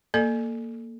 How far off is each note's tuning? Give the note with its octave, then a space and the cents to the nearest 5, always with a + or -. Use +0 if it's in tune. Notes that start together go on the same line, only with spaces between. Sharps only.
A#3 -10 A4 +0 D5 +40